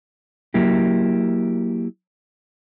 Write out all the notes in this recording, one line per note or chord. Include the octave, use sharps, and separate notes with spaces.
F#3 A#3 E4 G4